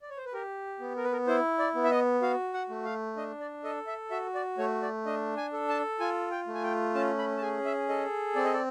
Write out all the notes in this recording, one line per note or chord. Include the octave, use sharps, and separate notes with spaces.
D5
C#5
C5
B4
G4 A#4
B3
A#4
B4
A#4
E4 C5
D5
B3
E5
D#5
F#4 F5
F#5
A3
F5
D4 D#5
D5
A4 D#5
E5
F#4 E5
D5
A3 C#5
D5
D4 D#5
G#5
A4
A5
F4 G#5
G5
A3
G#5
G5
C#4 A5
B5
A5
G#4 G#5
E5
A4 D#5
C4 D5
D#5
D5